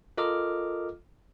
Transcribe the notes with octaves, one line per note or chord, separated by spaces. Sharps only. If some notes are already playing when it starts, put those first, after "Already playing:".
F4 A4 A#4 D#5 D6 F6